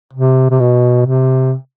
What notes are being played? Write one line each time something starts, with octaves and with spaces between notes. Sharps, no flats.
C3
C3
B2
C3